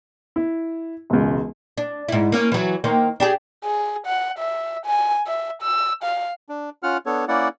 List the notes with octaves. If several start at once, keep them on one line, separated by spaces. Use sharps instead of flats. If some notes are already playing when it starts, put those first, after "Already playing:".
E4
E1 C#2
D4
G#2 E4
A#3 C#4
E3 F#3
D#3 A#3 C5
D4 G4 G#4
G#4
F#5
E5
G#5
E5
E6
F5
D4
C#4 F4 F#5 F6
B3 D4 A4 C#5
A#3 C#4 E4 D5 F#5